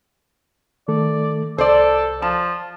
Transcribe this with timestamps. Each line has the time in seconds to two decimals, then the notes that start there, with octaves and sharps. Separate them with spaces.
0.88 D#3 A3 A4 D5
1.58 C2 A4 C5 D5
2.22 F3 A5